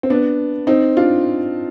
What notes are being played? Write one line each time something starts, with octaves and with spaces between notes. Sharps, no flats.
C4
B3 D4
C4 D#4
D4 F4